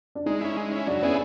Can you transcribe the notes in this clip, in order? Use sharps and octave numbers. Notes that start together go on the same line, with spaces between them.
D4
G#3 D#4
C#4 E4
G#3
C#4 E4
F#3 D4
B3 C#4 E4 G#4